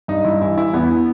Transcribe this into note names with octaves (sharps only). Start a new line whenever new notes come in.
G2 D#4
G2 E4
E3 E4
E3 E4
E2 B3